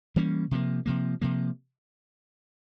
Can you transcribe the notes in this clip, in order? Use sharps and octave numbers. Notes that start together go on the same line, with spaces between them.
E3 G3 A#3 C#4
C3 F3 A#3
C3 F3 A#3
C3 F3 A#3